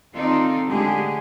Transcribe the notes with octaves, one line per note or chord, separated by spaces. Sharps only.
D#3 C4 D#4 F4 A4 D5
D3 G#3 A3 G4 G#4